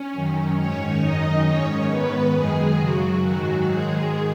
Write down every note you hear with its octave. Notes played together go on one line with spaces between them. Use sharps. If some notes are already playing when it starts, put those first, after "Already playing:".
Already playing: C#4
F#2 D#3
G#2 D#3 C#4 C#5
F#2 D#3 D#4 D#5
G#2 D#3 C#4 C#5
G#2 D#3 B3 B4
F#2 D#3 G#3 G#4
F#2 C#3 F#3 F#4
G#2 D#3 F#3 F#4
G#2 D#3 G#3 G#4